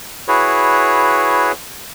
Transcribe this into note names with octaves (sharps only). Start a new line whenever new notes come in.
E4 F#4 G#4 B4 C#5